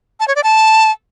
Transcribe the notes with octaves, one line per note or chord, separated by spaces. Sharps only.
A5
C#5
D5
A5